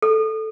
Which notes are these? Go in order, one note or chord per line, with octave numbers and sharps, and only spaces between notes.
A4